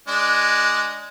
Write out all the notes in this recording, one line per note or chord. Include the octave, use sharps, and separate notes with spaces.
G#3 D4